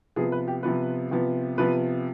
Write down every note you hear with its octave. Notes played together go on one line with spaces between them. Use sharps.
C3 F3 B3 G#4
B4
G4
C3 F3 B3 B4
C3 F3 B3
C3 F3 B3 B4